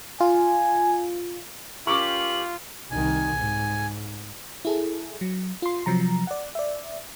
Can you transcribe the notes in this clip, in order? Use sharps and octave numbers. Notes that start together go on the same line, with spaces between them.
F4 G#5
C#4 F4 G4 A#4 C#6 D6 F#7
C2 D#3 G#5
G#2
E4 G#4 A4
F#3
F4 C6
C3 F3 F#3 A#5
D5 F#5
D5 E5